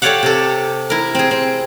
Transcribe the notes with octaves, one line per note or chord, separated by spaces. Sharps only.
G4 A4 C#5 D5 F5 F#5
C3 A4
E4 A#4
C4 G#4
C4